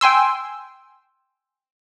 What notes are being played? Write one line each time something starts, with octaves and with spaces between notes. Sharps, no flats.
G5 G#5 C6 E6